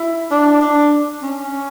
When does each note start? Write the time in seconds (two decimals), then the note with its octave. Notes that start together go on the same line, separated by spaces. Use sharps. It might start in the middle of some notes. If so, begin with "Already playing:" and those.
Already playing: E4
0.31 D4
0.61 D4
1.23 C#4